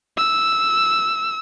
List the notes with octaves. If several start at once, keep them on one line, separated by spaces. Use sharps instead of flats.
E6